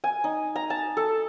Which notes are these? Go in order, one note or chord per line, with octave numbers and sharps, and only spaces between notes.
G#5
D#4
A#5
A5
A4